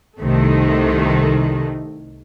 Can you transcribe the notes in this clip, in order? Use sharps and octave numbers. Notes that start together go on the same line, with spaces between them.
C2 C3 D#3 A3